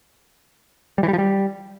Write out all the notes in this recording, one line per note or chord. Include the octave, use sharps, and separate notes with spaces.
G3
E3
G3
F3
G3